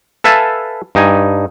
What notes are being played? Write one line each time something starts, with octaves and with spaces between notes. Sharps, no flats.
A4 B4 E5 F5 G#5 A5
G2 D#4 G#5